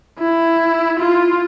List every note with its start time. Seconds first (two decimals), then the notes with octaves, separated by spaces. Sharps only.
0.18 E4
0.99 F4